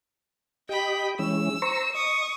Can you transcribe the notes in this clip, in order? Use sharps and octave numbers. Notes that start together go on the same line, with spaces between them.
G4 D#5 G5 B5
E3 G#3 C#4 E6
C5 A#5 C#6
D#5 C#6 D#6